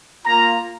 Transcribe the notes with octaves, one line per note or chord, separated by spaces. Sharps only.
A#3 F4 A#5